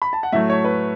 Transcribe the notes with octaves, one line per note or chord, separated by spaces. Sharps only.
B5
A5
F#5
A2 F#3 A3 E5
C#5
B4